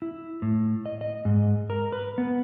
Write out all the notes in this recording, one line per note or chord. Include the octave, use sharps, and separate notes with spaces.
E4
A2
D#5
D#5
G#2
A#4
B4
B3